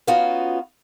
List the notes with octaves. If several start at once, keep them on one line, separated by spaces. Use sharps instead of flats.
B3 C#4 D#4 F4 F#4